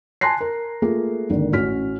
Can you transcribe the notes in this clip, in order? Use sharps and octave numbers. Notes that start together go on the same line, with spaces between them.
G#5 A5 C6 F#6 A#6 C7
A#4
A3 A#3 F4 G#4
G#1 D#2 D3 D#3
A1 C#4 F#4 F6 B6